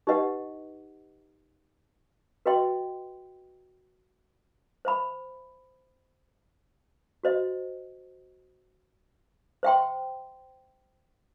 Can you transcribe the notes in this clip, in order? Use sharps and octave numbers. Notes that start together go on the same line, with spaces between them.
D#4 G4 B4 D#5 F#5
F#4 B4 D#5 G5 C6
C5 E5 B5
F#4 C5 D#5
C5 E5 G5 C6